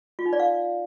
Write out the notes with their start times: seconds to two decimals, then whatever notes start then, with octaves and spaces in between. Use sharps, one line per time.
0.19 F4
0.26 D#4
0.33 D5
0.40 F5